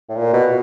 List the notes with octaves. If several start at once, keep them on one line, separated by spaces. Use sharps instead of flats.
A2
A#2
B2